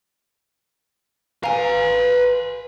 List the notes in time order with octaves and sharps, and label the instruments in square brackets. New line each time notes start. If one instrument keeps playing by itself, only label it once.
[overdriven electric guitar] B4 A#5 [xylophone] F5 G#5